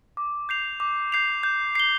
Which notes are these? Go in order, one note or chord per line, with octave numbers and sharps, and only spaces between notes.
D6
G6 C7 F7
D6
G6 C7 F7
G6
C7 G7